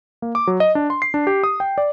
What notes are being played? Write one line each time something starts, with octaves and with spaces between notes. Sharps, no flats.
A#3
D6
F#3
D#5
D4
C6
C7
D4
G4
D#6
G5
D5